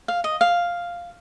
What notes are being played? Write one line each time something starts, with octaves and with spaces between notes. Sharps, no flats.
F5
D#5
F5